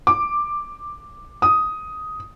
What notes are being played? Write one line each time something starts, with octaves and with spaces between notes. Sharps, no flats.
D6
D#6